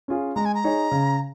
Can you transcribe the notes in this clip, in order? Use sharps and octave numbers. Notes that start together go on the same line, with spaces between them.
C#4 F4 G#4
G#3 A#5
G#5
A#5
D#4 G#4 C#5
C#3